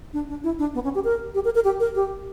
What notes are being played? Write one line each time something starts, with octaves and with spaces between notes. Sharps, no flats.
D4
D4
E4
D4
B3
C#4
G4
A#4
G4
A#4
A#4
G4
A#4
G4